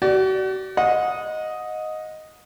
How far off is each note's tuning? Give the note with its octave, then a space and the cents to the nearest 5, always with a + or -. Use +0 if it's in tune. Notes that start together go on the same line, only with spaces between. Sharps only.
F#4 +40 D5 +0
D#5 +0 F#5 -30